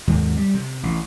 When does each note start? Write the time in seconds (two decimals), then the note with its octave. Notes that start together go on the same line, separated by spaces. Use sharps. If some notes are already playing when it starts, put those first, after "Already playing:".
0.07 D#2 G#2 C3
0.37 G3
0.54 C3
0.83 A1